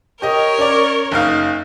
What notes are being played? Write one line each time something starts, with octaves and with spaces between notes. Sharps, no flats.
G4 A#4 C#5 D#5
C#4 D5
F#1 D#4 F5